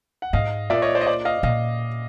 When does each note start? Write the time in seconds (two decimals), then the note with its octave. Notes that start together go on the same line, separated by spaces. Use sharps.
0.22 F#5
0.33 G#2 D#5 F5
0.70 A#2 D5 E5
0.82 C#5 D#5
0.95 C5 D5
1.01 D#5
1.06 C5 D5
1.25 D#5 F5
1.43 A#2 D#5 F5